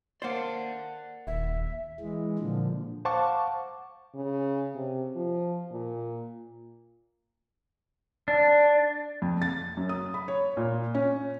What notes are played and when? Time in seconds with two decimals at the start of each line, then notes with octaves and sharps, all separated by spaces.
0.22 A#3 C5 D5 F#5
1.27 D#1 E5
2.00 E3 G#3
2.39 A#2 D3 F3
3.05 C5 F5 F#5 A5 C#6 D6
4.15 C#3
4.75 C3
5.16 F3
5.71 A#2
8.28 D4
9.22 F2
9.42 A6
9.77 F#2
9.89 D#6
10.14 B5
10.28 C#5
10.57 A#2
10.95 C#4